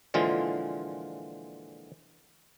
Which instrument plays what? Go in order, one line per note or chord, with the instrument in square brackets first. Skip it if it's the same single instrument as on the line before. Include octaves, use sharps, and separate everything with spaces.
[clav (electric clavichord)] A#2 D3 E3 F3 G#3 F4